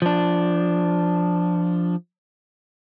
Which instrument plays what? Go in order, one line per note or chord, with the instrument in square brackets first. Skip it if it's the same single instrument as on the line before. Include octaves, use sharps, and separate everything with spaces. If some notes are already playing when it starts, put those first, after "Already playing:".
[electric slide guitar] F3 D4